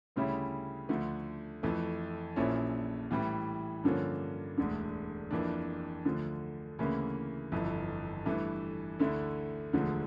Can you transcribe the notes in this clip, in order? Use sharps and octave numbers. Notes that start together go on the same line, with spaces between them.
D2 C#3 G3 C#4 E4
D2 D3 F3 A3
F2 E3 A3
A#1 A#2 F3 C#4 E4
A2 E3 G3
G2 D3 F3 A#3 C#4
E1 D2 D3
F2 E3 A#3 D4
D2 D3 F3
D2 C#3 E3 A#3 E4
G1 F2 E3
G2 E3 A3
D2 D3 A3 E4
E1 D2 D3 F3